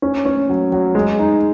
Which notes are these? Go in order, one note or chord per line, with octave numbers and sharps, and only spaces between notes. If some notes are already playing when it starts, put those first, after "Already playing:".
C#4
C#4
F#3
F#3
G#3
D#4